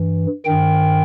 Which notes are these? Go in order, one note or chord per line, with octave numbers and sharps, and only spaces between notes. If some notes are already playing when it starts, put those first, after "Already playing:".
Already playing: G2 E3
G2 D#3 G5